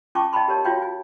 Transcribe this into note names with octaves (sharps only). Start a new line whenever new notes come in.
C#4 F4 G5 A5 C#6 D6
D#5 F5 G5 A5 B5 C6
G4 A#4 C#5 A5
F4 F#4 C#5 F5 G5
G#5